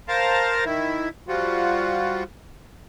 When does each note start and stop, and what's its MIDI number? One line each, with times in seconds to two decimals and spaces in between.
0.08 0.64 70
0.08 0.64 72
0.08 0.64 77
0.08 0.64 81
0.08 0.64 82
0.65 1.09 51
0.65 1.09 64
1.28 2.23 53
1.28 2.23 55
1.28 2.23 65
1.28 2.23 66